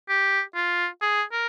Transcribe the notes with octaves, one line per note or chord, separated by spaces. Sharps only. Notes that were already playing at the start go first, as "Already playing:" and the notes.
G4
F4
G#4
A#4